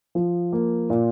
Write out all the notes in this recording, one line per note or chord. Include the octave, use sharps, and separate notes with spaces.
F3
A#3
A#2